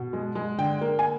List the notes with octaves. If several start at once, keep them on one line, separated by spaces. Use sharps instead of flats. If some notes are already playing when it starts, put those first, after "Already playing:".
Already playing: B2
G#3
G#3
D3 G5
A#3
G#5